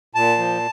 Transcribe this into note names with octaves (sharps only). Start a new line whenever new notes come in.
A#2 A5
F3